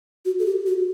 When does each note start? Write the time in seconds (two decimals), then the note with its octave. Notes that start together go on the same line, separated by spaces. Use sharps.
0.25 F#4
0.39 A4
0.46 G4
0.66 F#4